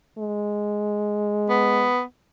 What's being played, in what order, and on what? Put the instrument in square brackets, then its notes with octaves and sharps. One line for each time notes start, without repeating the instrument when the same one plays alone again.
[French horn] G#3
[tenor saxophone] B3